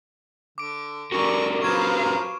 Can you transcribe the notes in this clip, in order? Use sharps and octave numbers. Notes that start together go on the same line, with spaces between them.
D3 D6 D7
D3 C#4 F#4 G4 A#4 D5 C#6
F3 F#3 A#4 B4 F5 C#6 G#6 E7